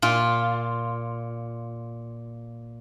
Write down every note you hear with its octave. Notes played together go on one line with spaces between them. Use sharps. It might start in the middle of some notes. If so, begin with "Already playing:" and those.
A#2 F4